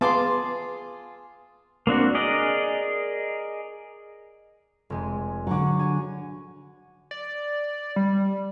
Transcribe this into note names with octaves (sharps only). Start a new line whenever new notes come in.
B3 F4 G#4 A5 C6 D6
A#3 C4 D4 F#4
G#4 A#4 D5 D#5
F1 G#3 G#5
D3 F#3 F#5 C#6 D6
C#5 G#5
D5
G3